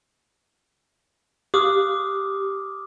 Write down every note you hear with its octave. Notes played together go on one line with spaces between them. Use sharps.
G4 D6 D#6 F6